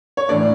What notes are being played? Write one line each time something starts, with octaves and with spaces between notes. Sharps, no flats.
C#5
A2 E3 A3 D4 D5